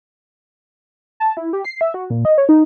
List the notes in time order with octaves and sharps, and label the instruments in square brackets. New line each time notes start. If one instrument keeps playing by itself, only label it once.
[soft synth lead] A5
E4
G4
C7
E5
F#4
A#2
D#5
C#5
D#4